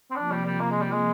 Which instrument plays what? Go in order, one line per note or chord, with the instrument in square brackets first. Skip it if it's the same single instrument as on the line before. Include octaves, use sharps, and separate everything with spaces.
[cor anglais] C4
[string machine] C3 F3 A#3 [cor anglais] D4
[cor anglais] G3
G3
A#3
G#3
G3
G#3